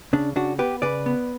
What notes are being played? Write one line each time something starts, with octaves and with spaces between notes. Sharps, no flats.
C#3 D4
C#3 D4 F#4
B3 G4 B4
C#3 B4 D5
B3